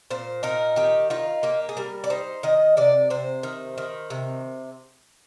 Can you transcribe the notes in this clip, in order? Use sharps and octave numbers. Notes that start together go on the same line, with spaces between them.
A#2 C5
D#4 A#4
D#3 G4
D#4 F4
A#3 G4
G#4
G3 A#4
D5
D#4 C5
D#3 D#5
C3 D5
C3 C5
D#3
D#3
C3